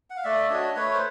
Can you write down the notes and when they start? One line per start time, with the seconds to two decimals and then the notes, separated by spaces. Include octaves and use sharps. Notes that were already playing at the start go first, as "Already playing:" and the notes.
0.10 F#5
0.17 F5
0.24 A3 D5 E5
0.49 D4 F#4 C#5 D#5
0.76 A3 B4 C#5
0.94 C5